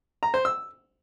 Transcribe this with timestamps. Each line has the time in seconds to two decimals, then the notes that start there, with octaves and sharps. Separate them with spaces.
0.23 A#5
0.34 C5
0.45 E6